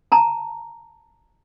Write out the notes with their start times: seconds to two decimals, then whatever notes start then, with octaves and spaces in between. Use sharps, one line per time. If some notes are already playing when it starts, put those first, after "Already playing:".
0.12 A5 A#5